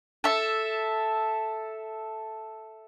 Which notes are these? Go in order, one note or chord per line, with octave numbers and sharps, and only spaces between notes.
A4 E5